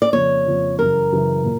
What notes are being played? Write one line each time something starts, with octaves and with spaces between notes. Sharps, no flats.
D5
F2 C#3 F3 A#3 C#5
F2 C#3 F3 A#3
F#2 C#3 E3 A#4
F#2 C#3 E3
A#2